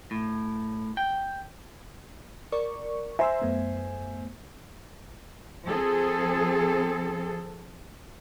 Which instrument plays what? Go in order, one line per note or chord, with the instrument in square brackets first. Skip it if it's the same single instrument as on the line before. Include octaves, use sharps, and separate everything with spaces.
[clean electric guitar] A2
G5
[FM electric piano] A#4 D5 C#6
[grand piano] C5 E5 G#5 [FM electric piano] A#5 C6 E6
[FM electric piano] F#2 A3 B3
[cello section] F3 C4 G#4 A4